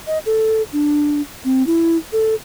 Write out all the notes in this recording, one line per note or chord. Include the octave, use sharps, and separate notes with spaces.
D#5
A4
D4
C4
E4
A4